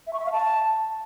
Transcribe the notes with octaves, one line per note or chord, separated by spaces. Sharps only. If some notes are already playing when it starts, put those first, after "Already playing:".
E5
C#6
E5
F5
A5